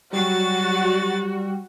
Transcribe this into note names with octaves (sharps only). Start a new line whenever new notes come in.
F#3 G3 F#4 A6